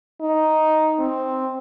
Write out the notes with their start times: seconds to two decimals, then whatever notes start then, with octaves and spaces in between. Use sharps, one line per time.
0.21 D#4
0.99 C4